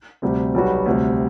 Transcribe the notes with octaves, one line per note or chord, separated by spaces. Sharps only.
D2 C3 G3
B1 B2 G3 B3 F#4
D2 C3 G3